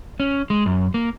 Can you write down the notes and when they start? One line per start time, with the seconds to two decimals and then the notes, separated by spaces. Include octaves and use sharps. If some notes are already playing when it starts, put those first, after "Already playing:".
0.20 C#4
0.50 G#3
0.66 F#2
0.94 A#3